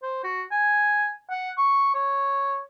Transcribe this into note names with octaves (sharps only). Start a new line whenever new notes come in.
C5
F#4
G#5
F#5
C#6
C#5